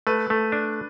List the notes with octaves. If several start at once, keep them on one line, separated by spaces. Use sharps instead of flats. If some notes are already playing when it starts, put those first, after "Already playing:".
A3 B4
A3
D4